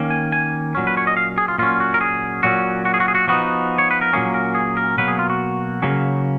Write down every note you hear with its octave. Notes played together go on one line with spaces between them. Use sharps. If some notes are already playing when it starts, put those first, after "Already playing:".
Already playing: D#3 A#3 C#4
G#5
G#5
A#2 F#3 C#4
B4
C#5
D#5
F5
G#4
F4
A#2 F#3 C#4 F4
F#4
A#4
G#4
A#2 F#3 C#4 F#4
F#4
G#4
F#4
G#4
F#4
F3 B3 D#4 F#4
C#5
B4
A#4
A#2 F#3 A#3 C#4 G#4
A#4
G#4
A#4
B2 F#3 A#3 B4
G#4
F4
F#4
C#3 F#3 A#3 C#4